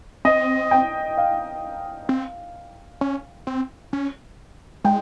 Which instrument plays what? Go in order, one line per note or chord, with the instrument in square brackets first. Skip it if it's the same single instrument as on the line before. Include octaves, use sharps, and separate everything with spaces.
[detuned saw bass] C4 [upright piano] D#5
[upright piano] G5
F5
[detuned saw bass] C4
C#4
C4
C#4
[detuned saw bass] G#3 [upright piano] G5